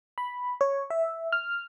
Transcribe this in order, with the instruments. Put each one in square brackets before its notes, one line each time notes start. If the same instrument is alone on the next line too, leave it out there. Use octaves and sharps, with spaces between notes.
[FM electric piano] B5
C#5
E5
F6